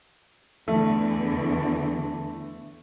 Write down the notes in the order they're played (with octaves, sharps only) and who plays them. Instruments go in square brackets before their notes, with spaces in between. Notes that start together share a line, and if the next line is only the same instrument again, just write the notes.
[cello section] E2 D3 E3 [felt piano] A3